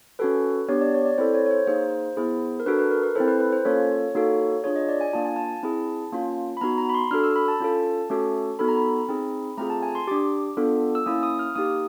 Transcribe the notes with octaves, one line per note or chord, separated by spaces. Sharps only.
C#4 F#4 A4 B4
B3 D4 G4 C#5
D5
C#5
D5
C4 E4 A4 C5
C#5
C#5
C5
A#3 D#4 G#4 C5
B3 E4 G#4
A#4
D4 F#4 A4 B4
B4
A#4
B4
C4 E4 A4 C5
B4
B4
C5
A#3 C#4 F4 A4 C#5
A#3 D#4 F#4 A4
D4 F4 G#4 C#5
D#5
D5
G#5
A#3 D4 F4 A5
G#5
A5
C4 E4 G#4
A#3 C#4 F4
B5
B3 D#4 F#4 A#5
A#5
B5
C6
D4 F#4 A4 F6
E6
B5
A5
C#4 F4 A4
A3 C#4 F#4 A4
B3 D#4 F#4 A4 B5
A#5
B5
C4 D#4 G#4
A3 C4 F4 G#4 A#5
A5
G#5
C6
D4 G4 D6
B3 D4 F4 A4
E6
A#3 C#4 E4 D#6
D#6
F6
A#3 D#4 G4 D#6